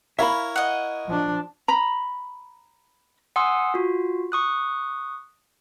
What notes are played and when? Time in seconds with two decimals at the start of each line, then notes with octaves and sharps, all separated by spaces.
0.19 E4 A#4 C#5 E5 F5 B5
0.56 D#5 F#5
1.06 F3 D4
1.68 A#5 B5
3.36 F#5 G#5 C6 D#6 E6
3.74 F4 F#4
4.32 C#6 D#6 F#6